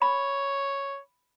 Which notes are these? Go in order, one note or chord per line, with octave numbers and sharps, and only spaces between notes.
C#5 B5